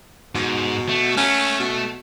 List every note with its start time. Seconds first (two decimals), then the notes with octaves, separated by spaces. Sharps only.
0.35 G#2 B2
0.89 A3
1.17 A3 C#4
1.59 B2